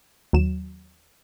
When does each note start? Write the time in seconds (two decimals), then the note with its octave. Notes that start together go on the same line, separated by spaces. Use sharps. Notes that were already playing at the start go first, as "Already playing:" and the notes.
0.33 D#2 F#3 E7